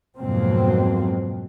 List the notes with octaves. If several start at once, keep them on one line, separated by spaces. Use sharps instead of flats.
F2 G#2 B2 F#3 A#3 C4